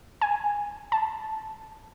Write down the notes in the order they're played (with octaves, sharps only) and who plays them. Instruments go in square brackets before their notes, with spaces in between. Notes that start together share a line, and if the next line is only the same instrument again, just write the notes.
[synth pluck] G#5
A5